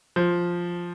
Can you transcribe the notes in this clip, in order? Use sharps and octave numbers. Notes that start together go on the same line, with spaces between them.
F3